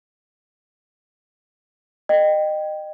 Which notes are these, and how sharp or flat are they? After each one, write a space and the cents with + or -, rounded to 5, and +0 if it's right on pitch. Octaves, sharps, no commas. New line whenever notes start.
D#5 -25 G5 +0